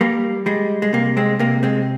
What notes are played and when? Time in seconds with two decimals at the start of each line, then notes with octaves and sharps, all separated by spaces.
0.01 G3 A#3
0.46 G3 G#3
0.82 G#3
0.93 C3 A#3
1.17 G#3 C4
1.39 C3 A#3
1.63 G#3 C4